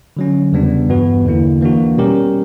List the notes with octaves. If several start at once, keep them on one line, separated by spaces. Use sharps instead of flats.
D3 F#3 C#4
E2 C#3 G3 B3 D4
G2 E3 B3 F#4 B4
E2 D3 A#3 E4
E3 A#3 D4 F#4
B2 G3 C#4 G4 A#4